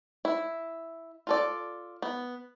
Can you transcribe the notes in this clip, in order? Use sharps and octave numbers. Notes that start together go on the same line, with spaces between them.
E4
F4 A4 D5
B3